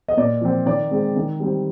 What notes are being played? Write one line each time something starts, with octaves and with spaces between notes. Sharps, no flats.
D#5
A#2 D5
F3 C4
D#3 D5
G#3 C4
D#3
G3 C4